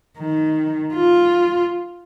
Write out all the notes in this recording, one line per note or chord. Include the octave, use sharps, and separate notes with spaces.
D#3
F4